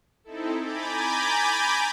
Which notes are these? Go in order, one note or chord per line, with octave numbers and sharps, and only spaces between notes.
C4 D#4 E4 A4
G#5 A#5 B5 D6 G6 A6